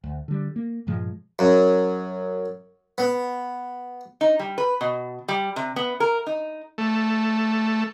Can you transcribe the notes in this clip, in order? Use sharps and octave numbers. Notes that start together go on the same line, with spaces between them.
D2
D3 G3
A#3
G2 A#2 F3 G#3
F#2
B3
D#4
G3
B4
B2
G3
C3
B3
A#4
D#4
A3